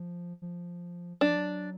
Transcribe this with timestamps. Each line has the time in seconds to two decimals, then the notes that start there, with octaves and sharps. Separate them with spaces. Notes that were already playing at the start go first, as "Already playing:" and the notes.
Already playing: F3
0.42 F3
1.21 F#3 D4
1.29 F3
1.36 F#3